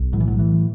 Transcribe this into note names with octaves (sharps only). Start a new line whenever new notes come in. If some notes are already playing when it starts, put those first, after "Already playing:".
Already playing: B1
A2 F#3
E3
F#3
E3